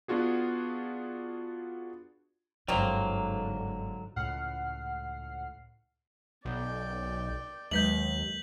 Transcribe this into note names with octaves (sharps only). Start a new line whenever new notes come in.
B3 D4 F4 F#4 G#4
G1 G#2 D3 D#3 F3 F#3 A#3 C#4
C#2 A2 F#5 F6 C7
B1 D5 G5
D#2 F#3 G#3 B4 G6 B6 F#7